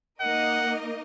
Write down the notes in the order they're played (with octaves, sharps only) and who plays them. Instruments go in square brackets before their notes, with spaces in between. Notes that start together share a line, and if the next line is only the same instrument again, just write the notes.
[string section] A#3 D#4 A#4 D#5 [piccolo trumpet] F#5